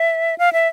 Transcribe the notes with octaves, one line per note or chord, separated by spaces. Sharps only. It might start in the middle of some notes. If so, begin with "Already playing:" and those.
Already playing: E5
F5
E5